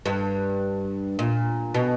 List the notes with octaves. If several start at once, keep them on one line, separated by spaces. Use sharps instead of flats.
G2
A#2
B2